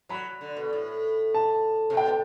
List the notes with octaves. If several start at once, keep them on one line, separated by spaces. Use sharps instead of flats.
F#3 B5
D3
B2
A2
A5
C3
B2 G5